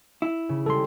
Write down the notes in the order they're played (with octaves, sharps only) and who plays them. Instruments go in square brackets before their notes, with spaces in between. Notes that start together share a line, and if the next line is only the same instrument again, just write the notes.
[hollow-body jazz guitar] E4
[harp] C#3
[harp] G3 G#3 [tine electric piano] A4 C6